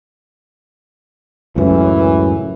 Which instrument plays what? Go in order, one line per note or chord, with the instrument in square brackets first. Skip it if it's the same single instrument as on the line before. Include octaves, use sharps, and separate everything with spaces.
[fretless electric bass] C#2 F#2 A2 [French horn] E3